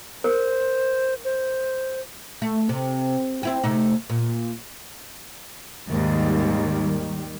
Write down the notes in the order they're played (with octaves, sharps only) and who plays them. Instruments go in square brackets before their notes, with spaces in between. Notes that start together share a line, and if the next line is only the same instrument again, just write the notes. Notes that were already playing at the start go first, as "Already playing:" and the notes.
[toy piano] A#4 [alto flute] C5
[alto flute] C5
[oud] A3
C3
C4 E4 G4
C3 A3 D#4
A#2
[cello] D#2 G#2 [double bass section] D#3 G3